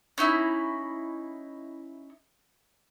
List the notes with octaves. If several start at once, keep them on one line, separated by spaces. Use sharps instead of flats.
C#4 D#4 E4